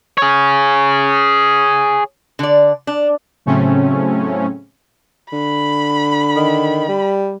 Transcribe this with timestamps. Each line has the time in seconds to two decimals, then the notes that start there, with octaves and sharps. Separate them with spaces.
0.18 G#4 C#5
2.39 D3 D5
2.87 D4
3.46 A2 C#3 F#3 A3 C4 C#4
5.32 D3 B5
6.36 D#3
6.88 G3